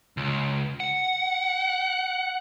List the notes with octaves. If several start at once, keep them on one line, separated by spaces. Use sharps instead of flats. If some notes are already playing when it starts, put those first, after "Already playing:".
C#2
F#5